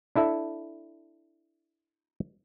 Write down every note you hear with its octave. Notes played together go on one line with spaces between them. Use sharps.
D4 E4 A4 E5